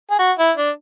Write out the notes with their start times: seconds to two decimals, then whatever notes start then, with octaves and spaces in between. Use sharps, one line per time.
0.10 G#4
0.18 F#4
0.38 E4
0.57 D4